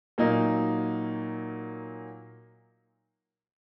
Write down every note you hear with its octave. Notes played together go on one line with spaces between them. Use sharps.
A#2 F#3 A#3 D#4